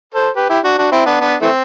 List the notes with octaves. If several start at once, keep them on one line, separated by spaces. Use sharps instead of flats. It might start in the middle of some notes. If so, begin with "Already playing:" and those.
A4 C5
G4 B4
E4 G4
D4 F#4
D4 F#4
C4 E4
B3 D4
B3 D4
E3 A3 C4